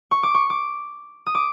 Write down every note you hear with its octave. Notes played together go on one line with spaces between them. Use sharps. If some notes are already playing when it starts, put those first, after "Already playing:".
C#6
D6
C#6
D6
D#6
D6